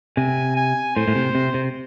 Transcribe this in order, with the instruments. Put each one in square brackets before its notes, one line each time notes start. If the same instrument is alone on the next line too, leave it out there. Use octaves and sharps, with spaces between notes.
[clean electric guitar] C3 [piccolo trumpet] G#5
[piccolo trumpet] G#5
[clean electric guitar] A2 [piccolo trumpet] C5
[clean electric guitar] A2
C3
C3
C3